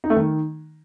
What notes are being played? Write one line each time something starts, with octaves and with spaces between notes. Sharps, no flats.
D#4
A3
D#3